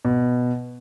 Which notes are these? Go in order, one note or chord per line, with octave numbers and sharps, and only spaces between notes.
B2